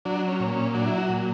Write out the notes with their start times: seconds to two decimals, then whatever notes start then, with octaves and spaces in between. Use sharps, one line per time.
0.05 F#3 D4
0.28 C#4
0.40 A#2
0.51 C#4
0.74 F#3 D4
0.86 E4
0.98 F#4
1.09 A#2